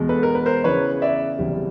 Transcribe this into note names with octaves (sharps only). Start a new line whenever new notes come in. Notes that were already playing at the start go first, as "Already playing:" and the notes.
Already playing: E2 B2 G#3
A4 B4
A#4
B4
A#4 C5
E2 C#3 E3 B4 C#5
D5 E5
F#1 E2 C3 E3 G3